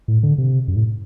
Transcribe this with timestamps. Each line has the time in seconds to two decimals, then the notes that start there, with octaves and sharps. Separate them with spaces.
0.08 A2
0.23 D3
0.38 C3
0.68 F#2
0.76 A2